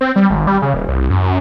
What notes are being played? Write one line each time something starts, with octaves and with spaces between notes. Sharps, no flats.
C4
G3
G#1
G3
C#3
D#1
C2
F#2
F#2